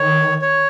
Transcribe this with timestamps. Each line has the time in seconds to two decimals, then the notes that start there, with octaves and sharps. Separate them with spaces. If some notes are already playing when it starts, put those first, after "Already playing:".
Already playing: D#3 C#5
0.42 C#5